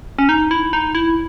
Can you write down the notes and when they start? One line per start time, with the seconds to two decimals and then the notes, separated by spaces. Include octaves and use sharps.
0.18 C#4
0.29 D#4
0.51 E4
0.73 D#4
0.95 E4